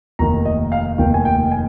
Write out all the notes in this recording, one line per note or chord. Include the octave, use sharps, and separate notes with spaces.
F1 D#2 D#3 A#5
D#5
F5
F1 D#2 D#3 G5
G#5
G5
G#5